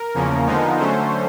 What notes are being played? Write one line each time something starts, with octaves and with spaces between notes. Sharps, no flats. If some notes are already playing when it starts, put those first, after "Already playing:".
Already playing: A#4
E2 C#3 F3 A#3 C#4
D3 F3 G#3 B3 D#4
D3 F#3 A3 C#4 C5